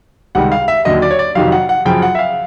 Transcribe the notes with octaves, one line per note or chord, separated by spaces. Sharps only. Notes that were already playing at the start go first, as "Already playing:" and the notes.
C#2 C3 D#3 G3 F#5
F5
E5
D#2 D3 F#3 D#5
D5
C#5
D5
F2 C3 D#3 F#3 F5
F#5
F#5
F#2 C#3 F3 G5
F#5
E5
F5